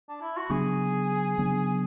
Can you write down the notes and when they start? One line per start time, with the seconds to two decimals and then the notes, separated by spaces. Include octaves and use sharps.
0.09 D4
0.22 E4
0.37 F#4
0.50 C#3 F#3 B3 D4 G#4
1.38 C#3 F#3 B3 D4